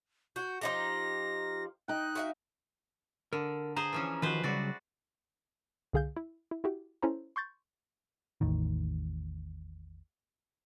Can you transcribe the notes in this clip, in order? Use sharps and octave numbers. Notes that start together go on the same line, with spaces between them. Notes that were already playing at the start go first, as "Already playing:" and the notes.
F#4 G6
F3 D#4 G4 A#6
D#4 G5 F#6
F#4 E5 F5
D3 A#4
G#4 C5 A#5
E3 F3 C#4
D#3 F3 F#4 B4 C5
C#3 F#3 G3 F#4 D5
C2 D3 G#4 F5 G6
E4
E4
E4 F#4 G4
C#4 E4 A4 C5 A#5
C6 C#6 G6 A6
A1 E2 A2 D#3